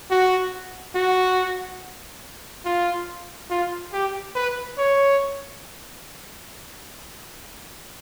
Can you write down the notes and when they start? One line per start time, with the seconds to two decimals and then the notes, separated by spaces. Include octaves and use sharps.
0.11 F#4
0.95 F#4
2.66 F4
3.50 F4
3.93 G4
4.35 B4
4.78 C#5